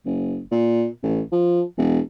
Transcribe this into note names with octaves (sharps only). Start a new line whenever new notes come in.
F#1
A#2
A1
F3
E1